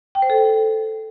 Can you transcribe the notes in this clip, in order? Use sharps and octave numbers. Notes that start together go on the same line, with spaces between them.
G5
C5
A4